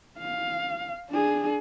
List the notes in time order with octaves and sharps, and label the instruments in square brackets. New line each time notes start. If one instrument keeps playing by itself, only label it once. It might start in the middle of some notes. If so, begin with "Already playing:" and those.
[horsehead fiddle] F5
D4 G#4